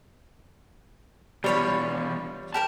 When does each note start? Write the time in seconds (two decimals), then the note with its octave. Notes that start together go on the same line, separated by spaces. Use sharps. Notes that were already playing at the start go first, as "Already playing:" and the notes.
1.44 E2 B2 G3 F4 C#5 B5
2.54 G4 A#4 G5 A5